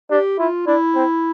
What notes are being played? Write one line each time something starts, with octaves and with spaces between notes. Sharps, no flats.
D4 G4
E4 F4
D4 E4
C4